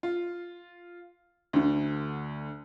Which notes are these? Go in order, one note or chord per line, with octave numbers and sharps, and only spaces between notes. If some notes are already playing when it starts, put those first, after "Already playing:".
F4
D2 D3